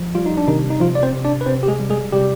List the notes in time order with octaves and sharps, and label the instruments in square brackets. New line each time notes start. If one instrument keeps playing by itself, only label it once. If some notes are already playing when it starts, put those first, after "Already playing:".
Already playing: [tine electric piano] F3
G3 F4
D#4
D4
C3 D#3 D#4
D#4
C3 F3 F4
D5
C4 C5
C3
D4 D5
B4
C3 C4 C5
G4
G#3 G#4
G3
G#3 G#4
C3 G3 G4